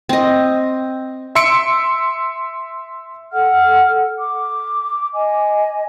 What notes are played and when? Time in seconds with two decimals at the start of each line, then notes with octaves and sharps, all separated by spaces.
0.09 C4 D#5
1.35 E5 C6 E6 C#7 D7
3.30 A4 F#5 F6
4.19 D6
5.13 D#5 G#5